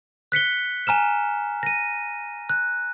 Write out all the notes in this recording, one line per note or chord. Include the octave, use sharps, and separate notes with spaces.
F#6 B6 C#7 G7
G#5 A#5 F6 E7
A#6 D#7
F#6